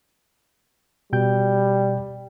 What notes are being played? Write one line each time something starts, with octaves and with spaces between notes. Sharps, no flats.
B2 G3 G5 G6